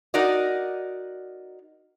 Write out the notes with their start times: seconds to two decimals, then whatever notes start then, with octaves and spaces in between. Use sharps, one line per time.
0.14 D#4 F#4 A#4 D5 D#5